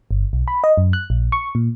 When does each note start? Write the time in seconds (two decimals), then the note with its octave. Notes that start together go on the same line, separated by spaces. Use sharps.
0.11 G1
0.33 B1
0.48 B5
0.64 D#5
0.78 F#2
0.93 F#6
1.10 A#1
1.32 C#6
1.55 A#2